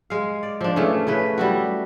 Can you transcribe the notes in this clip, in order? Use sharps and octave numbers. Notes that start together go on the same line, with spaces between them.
G#3 F5
D5
F3 D4
C#3 E3 A3 C#4
C#3 E3 B4
G3 E4 F#4